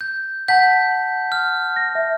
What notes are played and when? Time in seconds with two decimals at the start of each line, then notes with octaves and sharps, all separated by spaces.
0.01 G6
0.48 F#5 A5 G6 B6
1.32 F6
1.76 A#6
1.95 E5